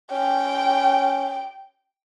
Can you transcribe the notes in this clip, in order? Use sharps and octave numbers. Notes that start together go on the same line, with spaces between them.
C#4 G5